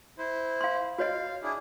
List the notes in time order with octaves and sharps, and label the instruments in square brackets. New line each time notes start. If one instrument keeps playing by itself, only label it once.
[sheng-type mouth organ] E4 C5
[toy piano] F5 C6
[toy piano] F#4 C#5 D#5 [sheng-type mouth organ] F5
[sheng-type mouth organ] D4 E4 G#4